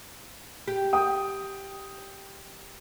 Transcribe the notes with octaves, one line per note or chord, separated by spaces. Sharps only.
G4
G5 D#6